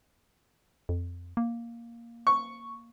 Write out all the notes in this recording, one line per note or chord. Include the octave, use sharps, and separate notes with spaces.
F2
A#3
C#6